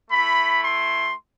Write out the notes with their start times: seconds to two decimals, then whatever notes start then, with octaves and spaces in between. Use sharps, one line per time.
0.11 A3 E4 B5
0.62 C6